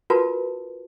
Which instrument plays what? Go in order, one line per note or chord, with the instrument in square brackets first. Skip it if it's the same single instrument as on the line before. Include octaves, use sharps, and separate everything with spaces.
[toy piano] F4 F#4 A#4 B4 A5